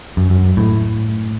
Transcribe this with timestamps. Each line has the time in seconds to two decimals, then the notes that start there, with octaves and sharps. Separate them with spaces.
0.17 F#2
0.30 F#2
0.57 A2